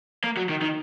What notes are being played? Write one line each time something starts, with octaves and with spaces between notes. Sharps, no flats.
A#3
F#3
D#3
D#3